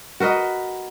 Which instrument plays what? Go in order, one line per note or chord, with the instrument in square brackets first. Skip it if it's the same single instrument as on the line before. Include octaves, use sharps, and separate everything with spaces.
[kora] F#4 A#4 B4 D#5